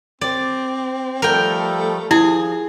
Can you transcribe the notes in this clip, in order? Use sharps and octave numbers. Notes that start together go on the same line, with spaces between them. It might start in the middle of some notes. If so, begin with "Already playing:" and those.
C4 D5
F3 G3 A3 A4 A#4 G5
F3 E4 G#4